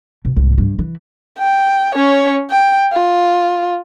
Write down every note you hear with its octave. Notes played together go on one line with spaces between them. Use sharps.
B2
C2 G#2
G2
E3
G5
C#4 C#5
G5
F4